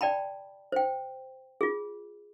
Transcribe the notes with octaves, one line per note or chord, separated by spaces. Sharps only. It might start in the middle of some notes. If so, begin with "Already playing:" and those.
D5 G5 A5 B5
C5 G5
F4 G#4